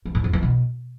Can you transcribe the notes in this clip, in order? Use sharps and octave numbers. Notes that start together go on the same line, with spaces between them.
E3
A2
F2
E3
B2